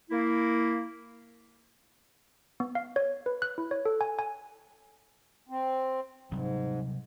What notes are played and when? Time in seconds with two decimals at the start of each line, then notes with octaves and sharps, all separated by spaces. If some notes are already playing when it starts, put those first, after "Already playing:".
0.11 A#3 E4
2.60 B3
2.75 F5
2.96 C#5
3.26 B4
3.42 F#6
3.58 E4
3.71 C#5
3.85 A4
4.01 G#5
4.19 G#5
5.49 C4
6.31 G#2 C3 F#3 G3